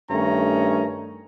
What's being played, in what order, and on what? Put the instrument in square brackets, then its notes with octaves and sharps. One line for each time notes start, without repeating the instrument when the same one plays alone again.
[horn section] G2 D#3 A3 C#4 A#5